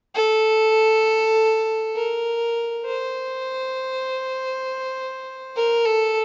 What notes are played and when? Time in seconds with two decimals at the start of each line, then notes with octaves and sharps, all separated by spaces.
0.14 A4
1.96 A#4
2.85 C5
5.56 A#4
5.85 A4